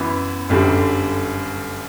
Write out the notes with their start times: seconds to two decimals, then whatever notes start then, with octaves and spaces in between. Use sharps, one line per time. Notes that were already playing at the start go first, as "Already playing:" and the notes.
Already playing: F#2 E3 B3
0.49 G1 F#2 D3 G3